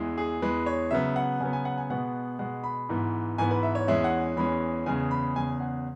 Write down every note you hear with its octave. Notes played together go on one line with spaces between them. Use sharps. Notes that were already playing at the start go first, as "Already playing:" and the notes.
Already playing: E2 E3 G#3
G#4
E2 E3 G#3 B4
C#5
C#3 F#3 B3 E5
F#5
C#3 F#3 B3 G#5
G#5
F#5
G#5
B2 G#3 B3 F#5
B2 G#3 B3 F#5
B5
G#2 E3 B3
G#2 E3 B3 G#5
B4
E5
C#5
E2 E3 G#3 C#4 E5
F#5
E2 E3 G#3 C#4 B5
E2 C#3 G#3 G#5
B5
E2 C#3 G#3 G#5
F#5